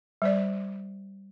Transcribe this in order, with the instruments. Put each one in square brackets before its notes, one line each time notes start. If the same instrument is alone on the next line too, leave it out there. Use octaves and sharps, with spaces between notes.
[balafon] G3 C5 D5